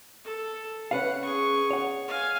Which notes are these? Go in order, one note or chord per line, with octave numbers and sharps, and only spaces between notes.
A4
C#4 B4 F5 F#5
G#4 C#6
C#5 F#5
F5 G#5